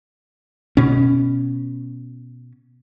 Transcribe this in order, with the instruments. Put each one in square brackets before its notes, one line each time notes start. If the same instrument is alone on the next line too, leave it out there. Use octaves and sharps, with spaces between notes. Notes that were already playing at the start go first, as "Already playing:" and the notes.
[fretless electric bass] B2 C#4